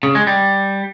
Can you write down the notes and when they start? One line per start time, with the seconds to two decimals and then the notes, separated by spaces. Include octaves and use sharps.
0.03 C#3
0.15 G#3
0.27 G3